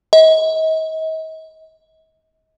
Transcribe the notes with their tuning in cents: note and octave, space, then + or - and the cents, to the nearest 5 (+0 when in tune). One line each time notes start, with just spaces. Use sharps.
D#5 +40